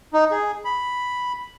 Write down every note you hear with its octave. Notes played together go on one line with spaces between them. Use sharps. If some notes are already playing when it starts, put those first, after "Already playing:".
D#4
G#4
B5